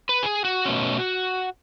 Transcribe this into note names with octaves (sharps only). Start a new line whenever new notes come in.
B4
G#4
F#4
B2 A3 C#4